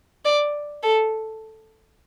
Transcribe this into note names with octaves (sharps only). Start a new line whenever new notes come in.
D5
A4